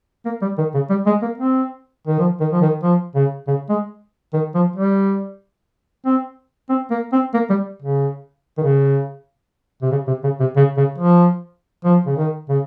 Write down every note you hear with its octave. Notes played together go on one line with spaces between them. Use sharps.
A#3
G3
D#3
C#3
G3
G#3
A#3
C4
D#3
F3
D#3
F3
D#3
F3
C#3
C#3
G#3
D#3
F3
G3
C4
C4
A#3
C4
A#3
G3
C#3
D#3
C#3
C3
C#3
C3
C#3
C3
C#3
C#3
F3
F3
C#3
D#3
C#3